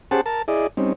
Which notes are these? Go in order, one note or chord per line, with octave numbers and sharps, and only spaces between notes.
C#4 G4 G#4 C5 F#5 A5
A#4 A5
E4 G#4 D5 D#5
G3 C4 C#4 D#4